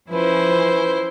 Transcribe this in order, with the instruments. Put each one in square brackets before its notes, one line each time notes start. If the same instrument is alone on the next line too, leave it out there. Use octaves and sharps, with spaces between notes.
[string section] F3 C#4 [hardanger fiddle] E4 C5 [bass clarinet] B4